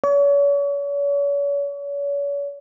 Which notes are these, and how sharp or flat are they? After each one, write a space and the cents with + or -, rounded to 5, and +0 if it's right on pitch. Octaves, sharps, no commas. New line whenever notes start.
C#5 +40